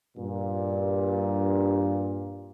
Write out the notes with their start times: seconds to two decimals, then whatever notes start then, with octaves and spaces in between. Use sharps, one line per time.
0.17 G2 A#2